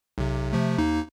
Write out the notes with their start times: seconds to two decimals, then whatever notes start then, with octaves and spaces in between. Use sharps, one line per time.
0.18 B1 C3
0.53 C3 F3 A3
0.78 D#2 A#3 D#4